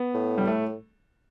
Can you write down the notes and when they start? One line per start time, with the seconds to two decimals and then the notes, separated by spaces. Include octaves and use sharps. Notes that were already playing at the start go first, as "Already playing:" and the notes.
Already playing: B3
0.14 A2
0.38 G3
0.47 A3